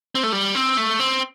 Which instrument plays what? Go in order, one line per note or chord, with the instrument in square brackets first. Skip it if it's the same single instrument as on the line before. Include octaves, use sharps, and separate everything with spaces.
[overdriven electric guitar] C4
A3
G3
C4
A3
C4